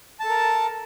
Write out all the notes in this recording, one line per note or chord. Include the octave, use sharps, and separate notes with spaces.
A4 A#4 A5